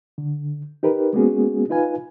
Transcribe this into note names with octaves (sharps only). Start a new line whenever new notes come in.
D3
D#4 G4 A#4 B4
G#3 A#3 B3 C#4 F#4 G#4
D#4 F4 B4 F5 G#5